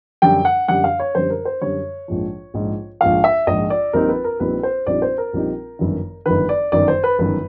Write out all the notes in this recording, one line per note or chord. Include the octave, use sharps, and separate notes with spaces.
F#2 D3 G3 G5
F#5
F#2 D3 G3 F#5
F5
C#5
F#2 D3 G3 C5
A#4
C5
F#2 D3 G3 C#5
A#1 G#2 F3
A#1 G#2 F3
A#1 G#2 F3 F5
E5
A#1 G#2 F3 D#5
D5
A#1 A#2 G3 C4 D#4 A#4
B4
A#4
A#1 A#2 G3 C4 D#4 B4
C5
A#1 A#2 G3 C4 D#4 D5
C5
A#4
A#1 A#2 G3 C4 D#4
G1 F#2 D#3
G1 F#2 D#3 B4
D5
G1 F#2 D#3 D5
C5
B4
G1 F#2 D#3 B4